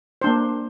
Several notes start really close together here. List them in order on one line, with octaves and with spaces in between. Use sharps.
C5 D4 A#3